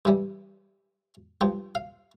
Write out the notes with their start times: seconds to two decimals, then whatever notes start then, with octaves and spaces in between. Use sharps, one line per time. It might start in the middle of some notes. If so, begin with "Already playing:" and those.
0.05 G2 E3 G3
1.41 G2 F3 G5
1.75 F5